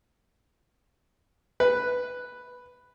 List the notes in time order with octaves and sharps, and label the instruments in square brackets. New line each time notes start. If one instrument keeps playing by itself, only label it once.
[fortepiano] B4